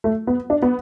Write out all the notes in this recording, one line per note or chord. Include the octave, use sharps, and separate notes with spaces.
A3
B3
D4
B3